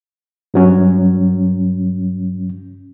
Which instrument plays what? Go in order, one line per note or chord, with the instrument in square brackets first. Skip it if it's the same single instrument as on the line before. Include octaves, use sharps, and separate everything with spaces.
[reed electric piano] G2 F#3 C#4